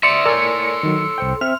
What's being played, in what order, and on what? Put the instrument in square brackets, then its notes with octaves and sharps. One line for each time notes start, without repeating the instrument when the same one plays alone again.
[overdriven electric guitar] D5 E5 [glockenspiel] C6 E6 F7 [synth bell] C#7
[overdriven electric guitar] A4 C#5 [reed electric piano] A#4 D5 G#5
[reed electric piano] D#3 F#3
C2 C5 G5
[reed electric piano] C4 E5 [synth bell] F6